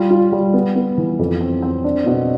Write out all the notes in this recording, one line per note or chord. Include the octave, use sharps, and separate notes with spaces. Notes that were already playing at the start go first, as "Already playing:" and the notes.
Already playing: G3 F4
F4
G3
B3
B3
E3
F2
C4
C4
D4
B2